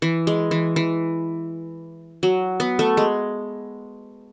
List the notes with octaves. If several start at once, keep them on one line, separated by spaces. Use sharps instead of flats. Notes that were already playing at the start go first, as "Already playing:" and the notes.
E3
G#3
E3
E3
F#3
B3
A3
G#3